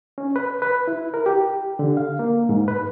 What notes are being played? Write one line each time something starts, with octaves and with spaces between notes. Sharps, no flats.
C#4
B4
B4
E4
A#4
G4
D3
F5
A#3
G#2
B4